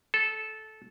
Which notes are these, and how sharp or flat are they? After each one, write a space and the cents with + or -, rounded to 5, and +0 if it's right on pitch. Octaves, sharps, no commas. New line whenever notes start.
A4 -15